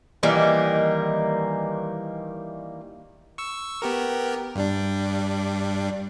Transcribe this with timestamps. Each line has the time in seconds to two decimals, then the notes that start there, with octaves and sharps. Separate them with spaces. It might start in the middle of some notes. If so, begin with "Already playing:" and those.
0.23 D#3 E3 G3 A#3
3.38 C#6 E6
3.82 B3 G4 A#4
4.55 G2 G3 D4